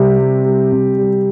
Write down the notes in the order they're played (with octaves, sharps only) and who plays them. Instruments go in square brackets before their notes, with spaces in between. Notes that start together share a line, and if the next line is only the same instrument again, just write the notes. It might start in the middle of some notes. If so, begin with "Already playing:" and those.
Already playing: [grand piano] C3 G3 G4
G3
G3
C3
G3